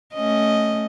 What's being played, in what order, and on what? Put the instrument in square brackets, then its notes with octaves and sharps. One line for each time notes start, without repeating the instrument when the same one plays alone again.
[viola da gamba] A3 C#4 D#5